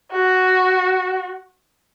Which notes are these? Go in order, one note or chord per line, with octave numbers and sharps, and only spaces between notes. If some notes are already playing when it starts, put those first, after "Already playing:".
F#4